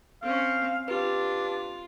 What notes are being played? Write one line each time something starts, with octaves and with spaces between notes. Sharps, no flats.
C4 C#4 F5
D4 F4 G4 B4